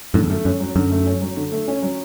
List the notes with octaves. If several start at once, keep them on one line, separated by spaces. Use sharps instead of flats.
F#2 A2 D3
E2
F#2 A3
F#2 C#4
F#3
F#2 D3
A3
C#4
F#3
D3
A3
C#4
F#3